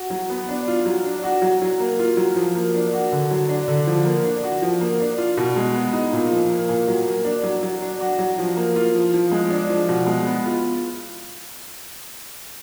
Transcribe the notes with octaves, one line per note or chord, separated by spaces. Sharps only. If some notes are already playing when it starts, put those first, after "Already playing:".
Already playing: F#4
F#3
B3
D4
F4
F#3
D4
F#4
F#3
F#3
A#3
F4
F#3
F3
A#3
D4
F#4
D3
F#3
D4
D3
F3
A#3
D4
F#4
F3
A#3
D4
F4
B2
G#3
B3
D#4
A#2
F3
A#3
A#2
F#3
A#3
D4
F#3
F#3
D4
F#4
F#3
F3
A#3
F4
F3
F3
G#3
D4
F3
B2
G#3
B3
F4